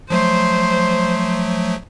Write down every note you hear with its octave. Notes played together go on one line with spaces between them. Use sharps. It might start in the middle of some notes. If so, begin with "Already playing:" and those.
F3 F#3 A3 C5